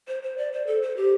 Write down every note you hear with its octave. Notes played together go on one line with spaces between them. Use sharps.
C5
C5
D5
C5
A4
C5
G4